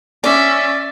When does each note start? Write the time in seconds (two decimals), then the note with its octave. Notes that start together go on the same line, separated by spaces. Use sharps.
0.24 C#4 D5 E5